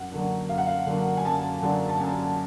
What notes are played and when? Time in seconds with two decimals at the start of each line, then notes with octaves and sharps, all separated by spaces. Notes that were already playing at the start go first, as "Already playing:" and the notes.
Already playing: F#2 F#5
0.11 D3 F#3 A#3 D4
0.49 F#2 F5
0.58 F#5
0.67 F5
0.86 D3 F#3 A#3 D4
1.17 G#5
1.25 F#2 A5
1.63 D3 F#3 A#3 D4
1.89 A5
2.00 F#2 G#5